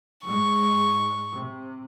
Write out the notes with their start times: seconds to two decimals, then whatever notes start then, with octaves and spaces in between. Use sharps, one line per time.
0.25 G#2 G#3 C#6
1.34 C3